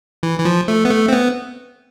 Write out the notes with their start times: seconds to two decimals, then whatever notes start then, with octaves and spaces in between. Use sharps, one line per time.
0.23 E3
0.39 E3
0.45 F3
0.68 A3
0.85 B3
0.90 A3
1.08 C4
1.13 B3